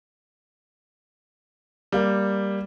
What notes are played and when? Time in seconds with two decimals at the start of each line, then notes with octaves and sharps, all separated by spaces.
1.92 G3 A#3